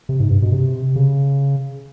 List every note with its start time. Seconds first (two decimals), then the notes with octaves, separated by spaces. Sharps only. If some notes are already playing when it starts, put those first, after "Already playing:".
0.09 C3
0.20 G#2
0.31 G2
0.42 B2
0.52 C3
0.96 C#3